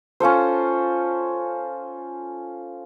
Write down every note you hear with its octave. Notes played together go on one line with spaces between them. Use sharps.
C#4 F4 A4 C5